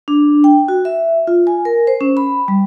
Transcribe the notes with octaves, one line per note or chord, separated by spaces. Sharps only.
D4
G5
F#4
E5
F4
G#5
A#4
C5
C#4
B5
G3